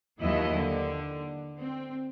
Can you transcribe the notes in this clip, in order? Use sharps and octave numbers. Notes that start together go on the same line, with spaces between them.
D#2 F3 F#3 E4 D#5 E5
D3
C4